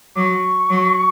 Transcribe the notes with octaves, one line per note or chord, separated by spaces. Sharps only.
F#3 C#6 D6
F#3